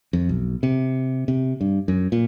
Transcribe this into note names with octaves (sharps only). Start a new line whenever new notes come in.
F2
B1
C3
C3
G2
F#2
A#2